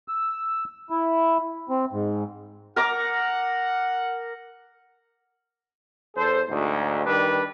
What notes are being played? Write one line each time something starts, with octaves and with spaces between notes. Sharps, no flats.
E6
E4
C4
G#2
A#4 F#5 A#5 D6
E2 A4 C5
D2 G#2
D#3 G3 D4 B4